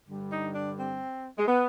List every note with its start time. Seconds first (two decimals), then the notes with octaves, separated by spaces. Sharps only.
0.07 G2 D3 G3
0.30 D#4
0.54 D4
0.77 C4
1.38 G#3
1.48 B3